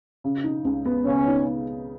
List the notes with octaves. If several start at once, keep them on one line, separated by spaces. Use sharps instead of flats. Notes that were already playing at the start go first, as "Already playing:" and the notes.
C#3
D#4
C#2
B3
C#3 C#4
D#4